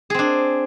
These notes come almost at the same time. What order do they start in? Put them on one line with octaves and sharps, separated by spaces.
G#4 C4 D4